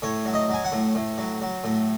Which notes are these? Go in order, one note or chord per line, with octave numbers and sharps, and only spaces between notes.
A2 C#5
F#3
D#5
F#3 G#5
F#5
A2
A2
F#3
F#3
A2